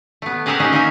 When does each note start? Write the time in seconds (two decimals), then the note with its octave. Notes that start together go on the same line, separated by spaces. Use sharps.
0.22 A3 B3
0.46 G4 G#4 A#4 E5 F#5 G#5
0.60 C#4 D#4 G#4 G5
0.72 A#3 C#4 D#4 G#4 E5 G#5